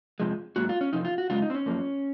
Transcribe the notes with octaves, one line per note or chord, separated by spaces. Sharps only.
F2 C3 F3 G#3
G#2 F#3 A#3 F#4
F4
C#4
F2 C3 F3 D#4
F4
F#4
F#2 C#3 G#3 F4
D#4
C4
C#4
F#2 F3 A#3